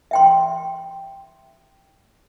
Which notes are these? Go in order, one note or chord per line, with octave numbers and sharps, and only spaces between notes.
E5 G5 C6